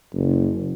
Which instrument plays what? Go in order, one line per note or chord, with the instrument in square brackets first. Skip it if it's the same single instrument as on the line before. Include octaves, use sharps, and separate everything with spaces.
[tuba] F#1